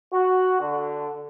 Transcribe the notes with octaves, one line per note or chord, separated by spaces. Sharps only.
F#4
D3